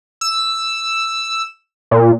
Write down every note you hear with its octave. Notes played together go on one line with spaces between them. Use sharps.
E6
A#2